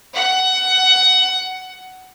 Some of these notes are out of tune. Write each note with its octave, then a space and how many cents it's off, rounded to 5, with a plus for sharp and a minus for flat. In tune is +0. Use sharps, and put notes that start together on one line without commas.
F#5 +15